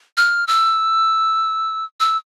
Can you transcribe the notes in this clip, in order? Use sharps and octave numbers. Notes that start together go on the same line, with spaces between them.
F6
E6
E6